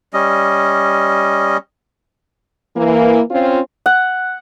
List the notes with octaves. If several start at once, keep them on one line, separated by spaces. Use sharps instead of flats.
G3 C#4 D#5
E3 A#3
C4 C#4 F4
F#5